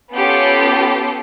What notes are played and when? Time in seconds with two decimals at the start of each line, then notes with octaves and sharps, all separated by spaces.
0.13 B3 C#4 F4 G4 A4